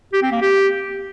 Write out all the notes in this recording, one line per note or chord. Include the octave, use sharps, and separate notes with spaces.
G4
C4
A#3
G4